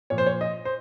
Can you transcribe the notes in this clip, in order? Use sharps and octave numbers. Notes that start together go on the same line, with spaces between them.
A#2 F3 C#5
C5
C#5
D#5
C5